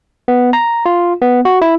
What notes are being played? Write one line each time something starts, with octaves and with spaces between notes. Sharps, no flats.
B3
A#5
F4
B3
F#4
E4